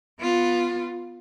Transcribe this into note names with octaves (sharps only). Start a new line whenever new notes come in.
B3 F4